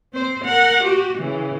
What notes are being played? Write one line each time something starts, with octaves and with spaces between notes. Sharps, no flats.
C4 C5
A#4 F#5
F#4 G4
C#3 E3